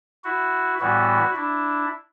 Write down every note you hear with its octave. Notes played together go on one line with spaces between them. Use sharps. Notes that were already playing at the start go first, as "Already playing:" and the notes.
E4 F#4
A2 E3 G3 B3 E4 F#4
D4 E4